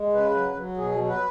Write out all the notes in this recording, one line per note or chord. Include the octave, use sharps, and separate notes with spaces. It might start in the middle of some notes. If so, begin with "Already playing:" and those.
Already playing: G#3
C#3 B4
F#3
F#3
B2 G#4
F#3
B4